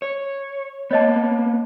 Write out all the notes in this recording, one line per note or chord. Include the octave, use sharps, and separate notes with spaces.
C#5
A#3 B3 C#5 D#5 A5